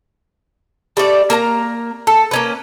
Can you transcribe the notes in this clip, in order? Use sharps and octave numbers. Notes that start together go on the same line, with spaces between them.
G3 A3 D5
A#3 A#4 A5 A#5
A4
A#3 C#4 B4